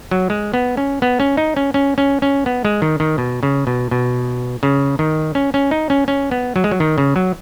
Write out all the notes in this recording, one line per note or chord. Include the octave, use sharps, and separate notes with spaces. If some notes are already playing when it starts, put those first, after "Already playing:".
F#3
G#3
B3
C#4
B3
C#4
D#4
C#4
C#4
C#4
C#4
B3
G#3
D#3
D#3
B2
C#3
B2
B2
C#3
D#3
C#4
C#4
D#4
C#4
C#4
B3
F#3
G#3
F#3
D#3
C#3
F#3